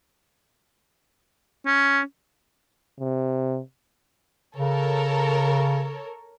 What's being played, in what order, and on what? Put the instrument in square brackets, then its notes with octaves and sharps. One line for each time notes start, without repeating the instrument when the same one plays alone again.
[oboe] C#4
[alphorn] C3
[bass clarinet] C#3 [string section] A4 A#4 C#5